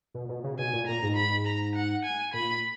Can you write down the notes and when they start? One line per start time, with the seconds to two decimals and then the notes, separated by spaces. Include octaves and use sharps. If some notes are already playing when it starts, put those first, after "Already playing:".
0.14 B2
0.29 B2
0.44 C#3
0.58 B2 G#5
0.73 A#2
0.87 A#2 A#5
1.03 G#2
1.16 B5
1.47 A#5
1.75 F#5
2.04 G#5
2.34 A#2 B5